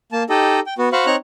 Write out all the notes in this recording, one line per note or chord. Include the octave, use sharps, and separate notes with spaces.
A#3 A5
D#4 G4 A4 D#5
G5
B3 F#4
F#4 C5 F5 B5 C#6
C4 D#4 C#5 A#5 C#6 F#6